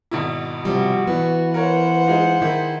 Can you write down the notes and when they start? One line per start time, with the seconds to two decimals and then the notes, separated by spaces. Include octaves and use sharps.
0.11 G#1 B2 E4
0.65 C3 F3 G3 F#4
1.07 E3 B3
1.54 A#4 C5 C#5 F#5
2.07 G#3 D#4 F4
2.42 D#3 E4 G#4